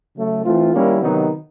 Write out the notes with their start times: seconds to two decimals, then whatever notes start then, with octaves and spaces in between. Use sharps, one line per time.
0.16 C#3 F#3 A3
0.44 E3 A3 C4 F4
0.73 D#3 G3 A#3 C#4 E4
1.01 C3 D#3 F#3 B3 D#4